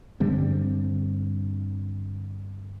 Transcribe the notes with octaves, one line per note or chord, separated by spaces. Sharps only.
G2 D3 G3 C4